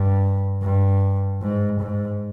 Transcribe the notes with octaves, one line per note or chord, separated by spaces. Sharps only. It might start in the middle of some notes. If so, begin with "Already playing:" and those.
Already playing: G2
G2
G#2
G#2